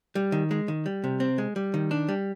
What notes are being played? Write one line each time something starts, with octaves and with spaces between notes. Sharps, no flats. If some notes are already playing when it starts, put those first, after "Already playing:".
G3
D#3
G#3
D#3
G3
C3
C4
G#3
G3
D#3
D4
G3